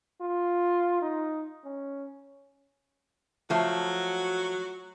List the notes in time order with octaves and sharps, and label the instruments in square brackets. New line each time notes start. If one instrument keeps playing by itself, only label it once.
[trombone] F4
D#4
C#4
[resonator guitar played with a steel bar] F3 A3 [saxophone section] F#3 F#4